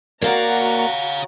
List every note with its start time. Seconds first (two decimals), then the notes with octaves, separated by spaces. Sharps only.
0.22 A#3 F#4 C#5 D5 F5 A#5